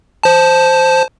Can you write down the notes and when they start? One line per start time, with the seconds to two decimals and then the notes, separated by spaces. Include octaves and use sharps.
0.23 C5 A5